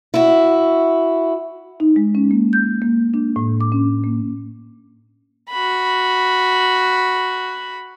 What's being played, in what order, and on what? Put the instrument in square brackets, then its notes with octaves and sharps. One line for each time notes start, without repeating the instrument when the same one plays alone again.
[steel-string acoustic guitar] E4 F#4
[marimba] D#4
G#3
C#4
A#3
G6
A#3
D4
A2
D6
C#4
A#3
[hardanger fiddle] F#4 B5